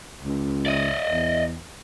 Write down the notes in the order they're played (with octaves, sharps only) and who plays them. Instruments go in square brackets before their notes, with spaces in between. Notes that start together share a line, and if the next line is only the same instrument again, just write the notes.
[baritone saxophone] C#2
[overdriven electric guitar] D5 D#5
[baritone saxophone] E2